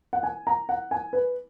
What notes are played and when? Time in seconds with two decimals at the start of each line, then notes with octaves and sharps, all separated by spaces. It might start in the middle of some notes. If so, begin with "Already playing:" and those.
0.13 F#5
0.23 G#5
0.47 A#5
0.69 F#5
0.91 G#5
1.13 B4